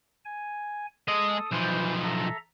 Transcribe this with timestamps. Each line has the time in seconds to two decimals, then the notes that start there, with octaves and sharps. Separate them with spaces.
0.25 G#5
1.08 G#3 A4 D#5 D#6
1.51 B1 E3 F3 C5 G6
2.04 A4 E5 A#5